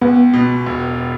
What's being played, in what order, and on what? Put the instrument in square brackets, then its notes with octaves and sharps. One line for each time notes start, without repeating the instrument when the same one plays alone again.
[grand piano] C#2 [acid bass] B3
[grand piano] B2
E1